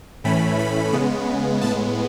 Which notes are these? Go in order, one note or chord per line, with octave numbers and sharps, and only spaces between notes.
A2 E3 A3 C#4 B5
B5
C#3 G#3 B3
A2 G#3 B3 A5